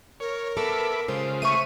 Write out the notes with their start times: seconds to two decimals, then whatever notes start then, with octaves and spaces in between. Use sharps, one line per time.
0.20 A#4 C#5
0.57 B3 A4 E5 B5 D6
1.08 C#3 G#3 F4 C5
1.42 A3 C5 E5 C#6 D#7